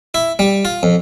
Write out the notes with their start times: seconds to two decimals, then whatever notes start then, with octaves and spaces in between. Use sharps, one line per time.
0.14 E4
0.39 G3
0.65 F4
0.83 F2